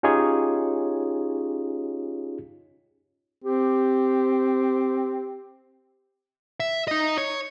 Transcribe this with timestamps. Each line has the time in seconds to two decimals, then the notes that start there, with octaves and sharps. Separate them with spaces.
0.03 C#4 D#4 F4 G4 G#4 C#5
3.44 C4 G4
6.60 E5
6.88 D#4 D#5
7.18 C#5